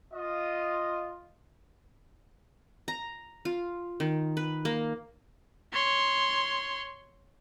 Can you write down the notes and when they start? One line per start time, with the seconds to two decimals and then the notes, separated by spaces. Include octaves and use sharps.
0.13 F4 D#5
2.88 A#5
3.45 F4
4.00 D#3
4.37 B4
4.65 A#3
5.73 C#5 C6